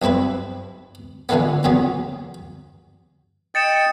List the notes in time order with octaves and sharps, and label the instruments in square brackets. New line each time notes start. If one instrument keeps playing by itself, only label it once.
[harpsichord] B1 G2 C4 E4 B4
A#2 D3 E3 G#3 A#3 B3
E2 A#2 C#3 F#3 B3
[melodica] D#5 G5 [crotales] A6 C#7 E7